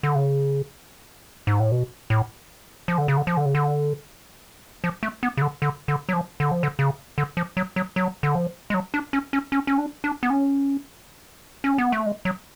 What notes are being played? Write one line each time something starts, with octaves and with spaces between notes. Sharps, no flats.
D3
C#3
G#2
A2
B2
A2
F3
D3
C#3
D3
F3
D3
C#3
D3
F3
A3
B3
C#3
D3
D3
D3
F#3
F3
D3
F3
D3
C#3
D3
F3
F#3
F#3
F#3
D3
F3
G#3
F#3
D4
C#4
C#4
C#4
C#4
D4
D4
B3
C#4
C#4
B3
A3
G#3
F#3